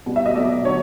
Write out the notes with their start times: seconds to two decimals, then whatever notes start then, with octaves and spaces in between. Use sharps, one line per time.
0.06 B2 G3
0.16 E5
0.26 D#5
0.35 B2 F#3 A3 D5
0.64 D3 F#3 C#5